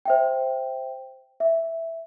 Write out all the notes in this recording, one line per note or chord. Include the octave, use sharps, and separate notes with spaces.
C5 E5 G5
E5